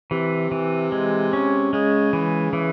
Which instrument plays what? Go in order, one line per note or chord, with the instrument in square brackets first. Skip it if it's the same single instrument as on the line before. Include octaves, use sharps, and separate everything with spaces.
[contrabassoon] C3 [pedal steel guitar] E3
[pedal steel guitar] E3
G#3
C#4
[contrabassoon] C#3 [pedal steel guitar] G#3
[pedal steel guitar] E3
E3